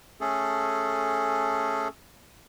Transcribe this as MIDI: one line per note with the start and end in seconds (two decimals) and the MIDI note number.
0.21 1.88 57
0.21 1.88 61
0.21 1.88 68
0.21 1.88 69